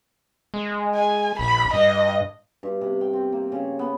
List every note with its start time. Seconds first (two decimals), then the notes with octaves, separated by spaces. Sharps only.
0.54 G#3
0.95 G#5
1.39 A#1 B5
1.73 G2 D#5
2.63 G2
2.81 C3
3.01 G5
3.13 C4
3.32 A#3
3.52 C#3
3.79 B3